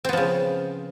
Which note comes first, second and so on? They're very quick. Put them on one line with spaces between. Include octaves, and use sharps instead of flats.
C4 B3 F3 C#3